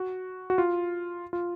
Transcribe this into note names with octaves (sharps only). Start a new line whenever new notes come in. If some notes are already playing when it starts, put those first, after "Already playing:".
Already playing: F#4
F#4
F4
F4